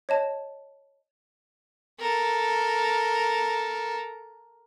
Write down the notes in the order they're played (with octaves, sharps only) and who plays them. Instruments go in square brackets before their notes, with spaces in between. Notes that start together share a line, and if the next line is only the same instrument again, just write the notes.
[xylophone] C#5 D#5 A5
[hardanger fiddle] A4 A#4